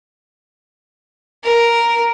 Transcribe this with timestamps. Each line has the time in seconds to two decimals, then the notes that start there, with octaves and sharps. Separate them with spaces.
1.44 A#4